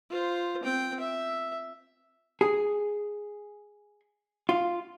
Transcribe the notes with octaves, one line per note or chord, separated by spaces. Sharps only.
F4 C5
C4 G5
E5
G#4
F4